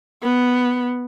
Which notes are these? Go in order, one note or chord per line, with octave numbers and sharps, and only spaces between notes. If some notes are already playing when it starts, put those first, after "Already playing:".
B3